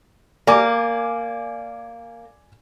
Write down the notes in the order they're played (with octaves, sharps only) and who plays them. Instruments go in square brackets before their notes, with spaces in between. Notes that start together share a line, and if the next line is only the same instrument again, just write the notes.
[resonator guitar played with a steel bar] A#3 [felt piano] D5 G#5 D6